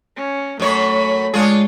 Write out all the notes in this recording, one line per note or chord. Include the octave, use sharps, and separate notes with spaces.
C#4
F#2 A3 C#5 B5
G#3 D4 F4 G#4 C#5